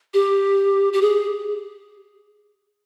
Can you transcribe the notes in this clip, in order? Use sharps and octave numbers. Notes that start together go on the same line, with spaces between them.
G4
G4
G#4